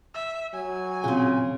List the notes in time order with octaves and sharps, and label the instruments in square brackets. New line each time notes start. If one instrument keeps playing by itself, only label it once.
[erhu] E5 [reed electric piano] E6
[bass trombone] F#3 [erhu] G#5
[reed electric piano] A#2 F4 G#4 [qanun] C#3 C4